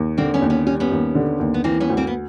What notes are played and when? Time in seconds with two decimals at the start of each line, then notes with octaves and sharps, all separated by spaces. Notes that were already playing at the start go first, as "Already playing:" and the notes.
Already playing: D#2
0.17 D3 A#3 C4
0.34 B3 C#4
0.42 D#2
0.50 B3 C#4
0.66 G3 C#4
0.80 B3 C#4
0.92 D#2
1.15 D3
1.40 D#2
1.54 B3
1.64 E3 A#3 C4
1.80 B3 C#4
1.89 D2
1.97 A#3 C4
2.07 B3